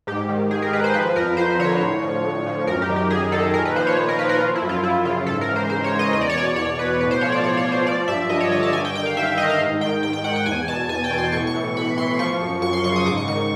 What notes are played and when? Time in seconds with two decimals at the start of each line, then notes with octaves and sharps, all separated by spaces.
0.07 G#2 G4
0.29 D#3
0.51 G#2 G#4
0.62 A#4
0.72 D#3 B4
0.84 C5
0.94 F3 B4
1.16 F2 A#4
1.37 F2 C5
1.59 D3 C#5
1.81 A2
2.02 F3
2.24 A2
2.46 F3
2.67 F#2 A#4
2.82 G4
2.89 D#3
2.96 G4
3.10 F#2 G#4
3.32 D#3 A4
3.53 A#2 A#4
3.65 B4
3.75 F3 C5
3.87 C#5
3.97 A#2 C#5
4.09 A#4
4.19 F3 B4
4.29 A#4
4.40 F3 F4
4.55 E4
4.62 F#2
4.69 F4
4.83 F#2 E4
5.05 C#3 F4
5.26 G#2 A4
5.41 A#4
5.49 E3
5.56 C5
5.70 G#2 C5
5.84 C#5
5.92 E3
5.99 D#5
6.13 E2 D#5
6.21 D5
6.30 C#5
6.36 B2 D5
6.56 E2 C#5
6.78 B2 B4
7.01 A2 B4
7.11 C5
7.21 F3 C#5
7.32 D5
7.43 A2 C#5
7.57 C#5
7.64 F3
7.72 C5
7.86 F3 D5
8.08 G2 E5
8.30 G2 D#5
8.40 C#5
8.51 D3 D#5
8.63 A5
8.73 G2 G#5
8.85 G5
8.95 D#3 G5
9.06 F5
9.17 G2 E5
9.38 D#3 D#5
9.50 F5
9.60 G#2
9.81 D#3 G5
10.03 G#2 G5
10.13 G5
10.24 D#3 F#5
10.36 G5
10.46 E2 G#5
10.68 B2 A5
10.89 E2 G#5
11.04 G5
11.11 B2
11.18 C6
11.32 A2 C#6
11.47 C#6
11.54 E3
11.76 A2 B5
11.97 E3 C6
12.19 F3 C#6
12.41 F#2
12.62 F#2 C#6
12.73 C6
12.84 C#3 C#6
12.96 D#6
13.06 G#2 D6
13.17 C#6
13.28 D#3 C#6